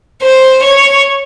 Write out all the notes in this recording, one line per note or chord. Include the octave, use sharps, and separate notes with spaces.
C5
C#5